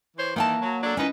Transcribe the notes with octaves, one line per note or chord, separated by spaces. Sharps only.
E3 C5 C#5
D#3 E3 A#3 G5 A5
F#3
F#3 D4 A4
D#3 C#4 D#4 E4 B4 D#5